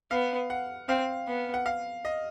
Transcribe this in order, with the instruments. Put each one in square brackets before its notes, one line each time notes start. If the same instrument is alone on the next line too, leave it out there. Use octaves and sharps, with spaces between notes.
[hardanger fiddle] B3 [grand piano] F5
[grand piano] F#5
[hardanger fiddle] C4 [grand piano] F5
[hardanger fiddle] B3
[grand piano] F#5
F5
D#5